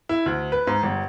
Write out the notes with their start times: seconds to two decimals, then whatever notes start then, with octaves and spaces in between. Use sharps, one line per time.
0.09 E4
0.26 D2
0.52 B4
0.67 G#2
0.83 G1